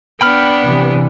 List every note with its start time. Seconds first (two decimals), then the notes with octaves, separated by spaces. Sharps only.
0.21 B3 D4 G5 B5 F6
0.61 C3 E3